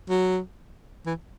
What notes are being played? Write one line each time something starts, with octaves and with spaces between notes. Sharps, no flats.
F#3
E3